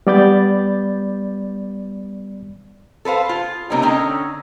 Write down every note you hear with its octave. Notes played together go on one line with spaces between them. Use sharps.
G3 B3 D5 B5 G6 A6
A4 B4 C5 F5
F4 G#4
C3 G3 A#3 C4 C#4 D#4
D3 C4 C#4 D#4 C#5